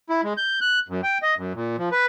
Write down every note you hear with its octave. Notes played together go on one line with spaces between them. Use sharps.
E4
G#3
G6
F#6
F#2
G5
D#5
F#2
A#2
F3
B4